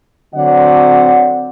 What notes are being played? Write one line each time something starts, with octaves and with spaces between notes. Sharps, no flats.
D3 F#3 C4 D5 F#5